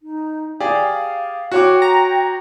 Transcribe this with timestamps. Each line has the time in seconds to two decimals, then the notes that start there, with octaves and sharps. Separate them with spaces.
0.02 D#4
0.60 G4 G#4 D5 F5
1.52 F#4 C#5 G5 D6
1.82 A#5